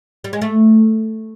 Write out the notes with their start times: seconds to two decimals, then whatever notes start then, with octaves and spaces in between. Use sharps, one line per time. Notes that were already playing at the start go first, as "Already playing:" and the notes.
0.24 G3
0.33 G#3
0.42 A3